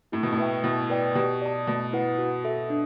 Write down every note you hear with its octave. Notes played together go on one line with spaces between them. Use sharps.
A2 E4
B2
A2
B4 E5 G5
B2 E4
B4 D5 G5
B2 G4
D5 A5
B2 A3
E4 B4 F#5
F#4
A4 E5
D4